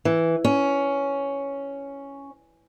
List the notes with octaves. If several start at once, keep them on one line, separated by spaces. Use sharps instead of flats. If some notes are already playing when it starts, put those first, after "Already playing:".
E3
C#4